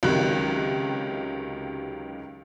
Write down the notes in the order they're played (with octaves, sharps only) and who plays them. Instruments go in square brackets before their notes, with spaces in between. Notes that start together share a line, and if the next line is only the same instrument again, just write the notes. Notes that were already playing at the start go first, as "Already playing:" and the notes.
[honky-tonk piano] C#2 C3 D#3 F#3 F#6